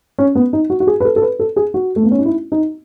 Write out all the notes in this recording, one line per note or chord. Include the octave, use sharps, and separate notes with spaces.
C#4
B3
D#4
F#4
F#4
G#4
B4
A4
A4
B4
A4
G#4
F#4
A3
B3
C#4
D#4
E4
D#4